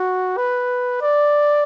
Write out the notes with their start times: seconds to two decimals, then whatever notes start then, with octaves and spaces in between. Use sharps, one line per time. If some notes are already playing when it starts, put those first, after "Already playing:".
Already playing: F#4
0.37 B4
1.02 D5